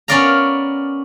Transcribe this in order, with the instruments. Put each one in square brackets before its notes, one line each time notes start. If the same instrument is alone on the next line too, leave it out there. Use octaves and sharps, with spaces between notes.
[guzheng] B3 C#4 A#4 D5 F5 A#5